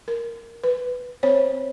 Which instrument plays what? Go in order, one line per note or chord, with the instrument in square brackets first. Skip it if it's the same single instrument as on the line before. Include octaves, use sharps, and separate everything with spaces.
[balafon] A#4
B4
C4 C5 C#5